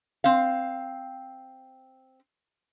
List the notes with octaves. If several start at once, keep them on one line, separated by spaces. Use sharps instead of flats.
C4 F5